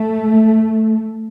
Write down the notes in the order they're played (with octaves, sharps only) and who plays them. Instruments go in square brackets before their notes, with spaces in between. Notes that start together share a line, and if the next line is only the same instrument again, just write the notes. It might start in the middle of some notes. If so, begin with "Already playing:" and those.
Already playing: [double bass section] A3